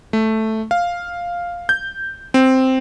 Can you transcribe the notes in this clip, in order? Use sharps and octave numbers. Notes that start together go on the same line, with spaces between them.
A3
F5
G6
C4